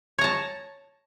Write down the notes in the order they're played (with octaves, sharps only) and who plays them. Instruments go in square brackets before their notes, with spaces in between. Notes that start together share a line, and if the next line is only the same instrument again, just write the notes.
[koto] C#5
A#5
A5